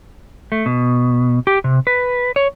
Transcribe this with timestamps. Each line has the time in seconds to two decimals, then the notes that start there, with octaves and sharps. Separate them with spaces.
0.52 A3
0.66 B2
1.47 G4
1.64 C3
1.87 B4
2.36 C#5